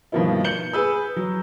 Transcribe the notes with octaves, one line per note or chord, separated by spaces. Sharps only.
G2 B2 D#3 F3 A#3 E4
G6 C#7 F#7 G7
G#4 B4 E6
F#3